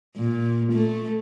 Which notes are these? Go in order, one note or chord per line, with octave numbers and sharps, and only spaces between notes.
A#2
A3